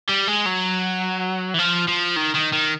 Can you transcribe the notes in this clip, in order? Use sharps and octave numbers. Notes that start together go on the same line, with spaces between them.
G3
G#3
F#3
E3
F3
F3
D#3
D#3
D#3